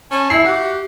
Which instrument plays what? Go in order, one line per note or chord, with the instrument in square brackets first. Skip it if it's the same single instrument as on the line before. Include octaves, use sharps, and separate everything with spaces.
[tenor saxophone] C#4 [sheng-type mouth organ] G#5 A5
[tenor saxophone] E4 [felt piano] E5 C7
[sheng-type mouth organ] F#4 F#5 [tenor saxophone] G4